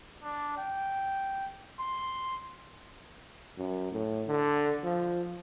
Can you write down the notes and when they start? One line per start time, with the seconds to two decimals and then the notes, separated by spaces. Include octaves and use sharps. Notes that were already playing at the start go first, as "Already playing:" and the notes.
0.23 D4
0.57 G5
1.79 C6
3.58 F#2
3.92 A2
4.28 D3
4.84 F3